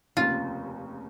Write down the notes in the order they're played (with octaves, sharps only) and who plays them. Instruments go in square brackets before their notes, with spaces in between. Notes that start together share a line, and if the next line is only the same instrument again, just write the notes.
[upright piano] F1 D#2 C#3 [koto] F4